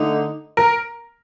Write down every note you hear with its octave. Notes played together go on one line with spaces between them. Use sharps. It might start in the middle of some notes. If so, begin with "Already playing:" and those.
Already playing: D3 A3 D#4
A#4